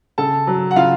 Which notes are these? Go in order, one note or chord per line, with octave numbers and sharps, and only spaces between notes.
C#3 A4 A5
F#3
F#5
C#3 F4 F5